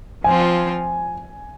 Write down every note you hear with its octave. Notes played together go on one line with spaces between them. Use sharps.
F3 C4 F4 G#5